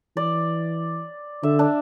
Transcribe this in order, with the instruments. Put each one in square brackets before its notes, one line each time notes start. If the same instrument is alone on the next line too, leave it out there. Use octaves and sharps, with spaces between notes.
[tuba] E3 [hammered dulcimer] D5
[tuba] D3 [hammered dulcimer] E5
[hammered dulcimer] D4